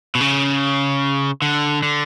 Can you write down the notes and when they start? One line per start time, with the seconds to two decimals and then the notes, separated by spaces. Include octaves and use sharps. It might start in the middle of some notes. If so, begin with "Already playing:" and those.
0.15 B2
0.21 C#3
1.42 D3
1.83 D3